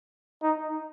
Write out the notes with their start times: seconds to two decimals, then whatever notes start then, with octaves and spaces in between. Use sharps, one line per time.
0.42 D#4